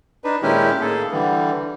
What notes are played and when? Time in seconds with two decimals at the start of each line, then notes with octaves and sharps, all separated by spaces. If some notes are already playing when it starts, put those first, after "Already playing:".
0.24 D4 D#4 B4
0.42 A#2 D#3 G#3 C#4 E4 G4
0.81 A2 A#3 G#4 A4
1.12 D3 E3 G3